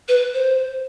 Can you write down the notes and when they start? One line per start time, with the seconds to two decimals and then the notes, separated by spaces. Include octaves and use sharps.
0.08 B4
0.34 C5